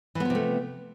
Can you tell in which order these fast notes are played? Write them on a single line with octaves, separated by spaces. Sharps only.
E3 B3 F3 C3 A3